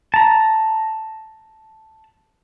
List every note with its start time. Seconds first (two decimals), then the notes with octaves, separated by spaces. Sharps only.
0.14 A5 A#5